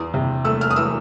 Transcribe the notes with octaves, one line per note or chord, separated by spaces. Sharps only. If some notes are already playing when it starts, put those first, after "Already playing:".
Already playing: E2 D#6
C3
A3 E6
F6
D#6
E3 E6